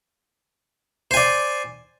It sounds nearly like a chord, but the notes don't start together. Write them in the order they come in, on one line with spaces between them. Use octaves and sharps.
C5 G#5 D5